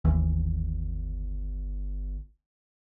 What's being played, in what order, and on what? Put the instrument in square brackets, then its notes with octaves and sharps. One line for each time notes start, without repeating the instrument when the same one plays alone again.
[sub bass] G1 [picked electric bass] D#2 E3